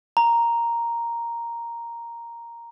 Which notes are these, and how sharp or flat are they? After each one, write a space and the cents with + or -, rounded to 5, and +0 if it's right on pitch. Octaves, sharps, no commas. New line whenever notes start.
A#5 +0